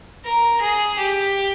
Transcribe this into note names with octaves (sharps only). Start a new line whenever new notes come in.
A#4
G#4
G4